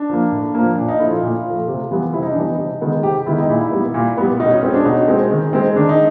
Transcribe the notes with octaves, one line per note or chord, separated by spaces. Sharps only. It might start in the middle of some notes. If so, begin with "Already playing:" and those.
Already playing: D4
F3 A#3
A2
F3 A#3
A#2 D4
D#4
F3 A3 E4
F4
A#2
F3 A3
C3
E3 G3 B3
C3 E4
D#4
D4
E3 G3 B3 D#4
C3
D#3 G#3 B3
C3 G4
D#3 G#3 B3 E4
D#4
A#2 E4
G3 B3
A#2
G3 B3
B2 D#4
C#4
G#3 C4 C#4
D4
B2 D#4
G#3 C4
D#3
G#3 C4
D#3 D4
D#4